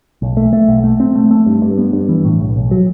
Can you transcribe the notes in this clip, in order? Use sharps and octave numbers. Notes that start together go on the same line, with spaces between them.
B1
A3
A3
B1
A3
C4
A3
A3
G2
G2
B3
G2
E3
A2
B1
B1
F#3